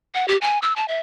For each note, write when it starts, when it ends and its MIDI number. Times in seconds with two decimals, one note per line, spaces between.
0.14 0.26 78
0.28 0.37 67
0.41 0.59 80
0.62 0.73 88
0.76 0.86 81
0.88 1.01 76